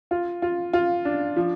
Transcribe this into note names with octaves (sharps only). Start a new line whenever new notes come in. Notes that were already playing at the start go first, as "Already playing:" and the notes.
F4
F4
F4
D4
F3